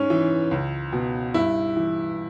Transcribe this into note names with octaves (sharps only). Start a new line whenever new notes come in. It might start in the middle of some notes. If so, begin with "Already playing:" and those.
Already playing: G#2 C#4
E3
C#2
B2
G2 E4
E3